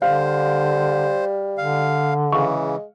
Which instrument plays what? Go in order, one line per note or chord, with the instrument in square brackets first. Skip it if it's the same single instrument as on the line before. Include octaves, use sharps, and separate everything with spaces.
[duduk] D3 [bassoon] G3 [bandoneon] C5 [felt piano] F5
[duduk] D3 [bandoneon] F5
[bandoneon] C#3 E3 [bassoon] G#3 [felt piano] F5 C#6